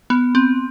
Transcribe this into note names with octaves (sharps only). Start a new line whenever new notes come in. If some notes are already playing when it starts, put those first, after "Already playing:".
B3
C4